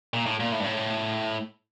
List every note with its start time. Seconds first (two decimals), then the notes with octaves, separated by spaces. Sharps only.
0.14 A#2
0.26 A2
0.40 A#2
0.52 A2
0.60 G2
0.64 A2